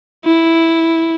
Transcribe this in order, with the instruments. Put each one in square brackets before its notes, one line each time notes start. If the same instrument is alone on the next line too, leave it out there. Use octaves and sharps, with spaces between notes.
[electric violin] E4